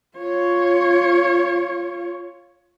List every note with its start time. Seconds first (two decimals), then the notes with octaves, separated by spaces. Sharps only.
0.18 F4 C#5